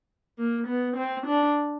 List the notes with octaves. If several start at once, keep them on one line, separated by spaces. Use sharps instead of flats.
A#3
B3
C4
D4